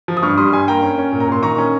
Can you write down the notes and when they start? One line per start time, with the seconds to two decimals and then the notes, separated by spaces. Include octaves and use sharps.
0.08 F3
0.17 D#6
0.23 G2 C#6 F6
0.37 G3 C6 D#6
0.52 G2 G#5 C6
0.67 A#3 G5 A#5
0.82 C#4
0.98 C#4
1.13 A#2
1.20 A#5
1.28 A#2 C6
1.43 D#3 A#5 C#6
1.58 C#4